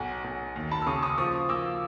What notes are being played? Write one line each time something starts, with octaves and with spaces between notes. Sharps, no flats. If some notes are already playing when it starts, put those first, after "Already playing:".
Already playing: B1 F#5 G#5
B1
D#2
A5 B5
E6
C#3 C#6 D#6
C#6 D#6
F3 C#6 D#6
A#3 D6 E6